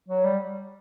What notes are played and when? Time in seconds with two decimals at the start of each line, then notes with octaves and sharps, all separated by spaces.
0.08 F#3
0.24 G3